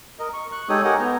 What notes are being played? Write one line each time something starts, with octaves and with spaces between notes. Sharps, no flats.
A#4 D#5
C#6
C#6 F#6
G#3 D#4 G4 A4 C#5 D#6
G4 A#4 D#5 F#5 G#5
B3 A#5